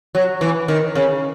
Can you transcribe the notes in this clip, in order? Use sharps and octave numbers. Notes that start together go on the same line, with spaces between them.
F#3
E3
D#3
C#3